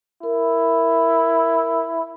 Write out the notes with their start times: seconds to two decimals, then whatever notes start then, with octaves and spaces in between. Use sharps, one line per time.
0.23 E4 A#4